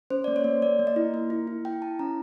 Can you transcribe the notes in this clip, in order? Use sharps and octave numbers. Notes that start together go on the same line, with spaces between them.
C#4 C5
A#3 D5
C#5
A#3
A#3 D5
A#3
D#5
E4
A#3
E4
E4
E4 G5
E4 A5
C#4 A#5